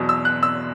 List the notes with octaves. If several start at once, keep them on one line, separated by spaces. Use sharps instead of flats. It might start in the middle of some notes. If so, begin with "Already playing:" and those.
Already playing: E2 B2 F#3
E6
F#6
E6